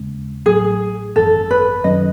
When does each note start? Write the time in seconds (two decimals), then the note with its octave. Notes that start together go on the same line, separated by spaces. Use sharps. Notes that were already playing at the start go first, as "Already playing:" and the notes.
Already playing: D#2 C#3 G#3
0.46 A1 A2 F#3 G#4
1.16 G#1 F#2 E3 A4
1.51 B4
1.84 F#2 D#3 F#3 C#4 D#5